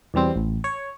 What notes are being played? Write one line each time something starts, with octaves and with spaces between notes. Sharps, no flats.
E2 B2 G3 C4
A1
C#5